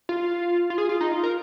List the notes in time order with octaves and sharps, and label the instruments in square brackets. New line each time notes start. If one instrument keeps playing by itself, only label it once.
[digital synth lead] F4
F4
G#4
F4
D#4
F4
A#4